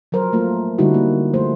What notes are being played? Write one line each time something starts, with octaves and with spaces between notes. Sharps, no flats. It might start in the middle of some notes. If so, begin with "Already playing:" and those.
F3 F#3 A#4 C5
A3 A#3 F4
D3 G3 G#3 D#4 E4 F#4
A#3
F3 A3 C5